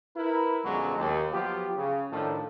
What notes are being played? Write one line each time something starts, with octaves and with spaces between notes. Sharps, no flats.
E4 A#4 B4
F#2 B2 D3 F3 F#3 G#3
D#2
F3 F#3 B3 F4 G4
C#3
A2 D#3 F3 D4 D#4 A4